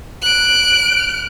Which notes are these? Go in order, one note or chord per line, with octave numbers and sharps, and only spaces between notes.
F#6 D7